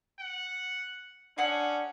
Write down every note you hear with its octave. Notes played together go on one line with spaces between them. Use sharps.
F#5
C#4 D4 G#4 F#5